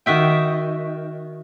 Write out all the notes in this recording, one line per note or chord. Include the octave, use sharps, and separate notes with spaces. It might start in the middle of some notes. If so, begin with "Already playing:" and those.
D#3 F#4 E5 G5